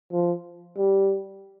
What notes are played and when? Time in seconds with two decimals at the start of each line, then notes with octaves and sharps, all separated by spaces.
0.12 F3
0.77 G3